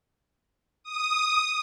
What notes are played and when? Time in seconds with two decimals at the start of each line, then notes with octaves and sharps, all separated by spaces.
0.84 D#6